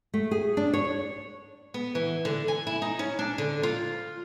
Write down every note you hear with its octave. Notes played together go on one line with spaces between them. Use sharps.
A3
G#4
D4
C#5
B3
E3
D3
G#5
E4
D#4
C#4
D4
D3
F4